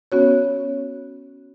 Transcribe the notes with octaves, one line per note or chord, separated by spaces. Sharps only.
B3 C#4 F#4 C#5